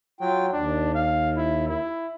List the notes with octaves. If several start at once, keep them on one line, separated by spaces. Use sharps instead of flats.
F#3 F4 G5
D#2 D4
F5
E4
E4